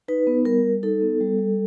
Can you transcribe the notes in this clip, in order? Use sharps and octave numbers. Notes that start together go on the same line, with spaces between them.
D#4 B4
B3
G3 A#4
G3
D#4 A4
B3
G3
G3